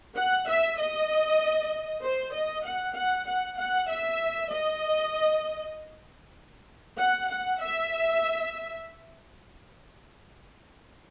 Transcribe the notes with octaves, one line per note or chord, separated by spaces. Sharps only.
F#5
E5
D#5
C5
D#5
F#5
F#5
F#5
F#5
E5
D#5
F#5
F#5
E5